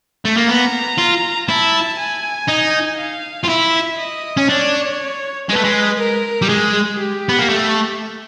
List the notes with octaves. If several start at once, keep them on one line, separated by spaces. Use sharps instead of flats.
A3
A#3
B3 A#5
F4
E4 A5
G#5
D#4
F5
F4
E4 E5
D#5
C#4
D4 C#5
G#3 B4
A3
G#3
A#4
G3
G#3 G#4
G4
B3
A#3
A3